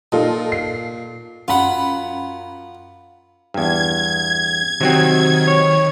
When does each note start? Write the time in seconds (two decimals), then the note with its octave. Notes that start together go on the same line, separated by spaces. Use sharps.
0.12 A#2 D#4 F4 A4
0.52 C7
1.48 F#2 F4 F#5 B5
3.54 E2 G2 G#6
4.81 C3 D#3 F#3 C4
5.48 C#5